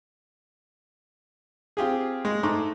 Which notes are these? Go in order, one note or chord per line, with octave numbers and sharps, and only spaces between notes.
C4 F4 G4 G#4
G#3
G#2 A3 C6 D6